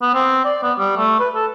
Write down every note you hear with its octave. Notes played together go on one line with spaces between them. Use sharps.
B3
C4
D5
B3
G3
A3
B4
A4